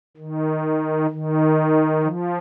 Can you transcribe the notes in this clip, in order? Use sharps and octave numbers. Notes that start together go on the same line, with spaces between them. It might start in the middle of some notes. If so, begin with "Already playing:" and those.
D#3
D#3
F3